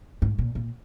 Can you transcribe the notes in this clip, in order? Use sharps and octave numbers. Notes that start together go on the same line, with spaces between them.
G#2
A#2
A#2